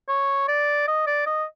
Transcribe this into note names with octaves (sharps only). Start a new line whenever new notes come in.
C#5
D5
D#5
D5
D#5